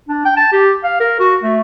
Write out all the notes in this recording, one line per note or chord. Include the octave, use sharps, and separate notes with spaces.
D4
G5
A5
G4
F5
A#4
F#4
A3